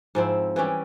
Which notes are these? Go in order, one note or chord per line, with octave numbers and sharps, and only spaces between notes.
G#2 F3 C4 E4
E3 G3 C#4 G4